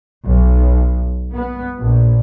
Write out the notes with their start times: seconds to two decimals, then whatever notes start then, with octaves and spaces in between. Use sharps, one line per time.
0.25 B1
1.32 B3
1.79 A#1